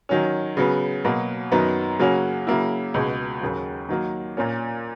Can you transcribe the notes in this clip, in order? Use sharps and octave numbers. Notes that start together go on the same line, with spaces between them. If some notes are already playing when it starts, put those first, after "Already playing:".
D#3 F#3 C#4
C#3 F#3 B3
B2 F#3 A#3
F#2 D#3 F#3 B3
C#3 F#3 A#3 C#4 F#4
C#3 F#3 A#3 E4
C#2 B2 G#3
D#2 C#3 F#3
D#3 F#3 A#3
A#2 A#3 C#4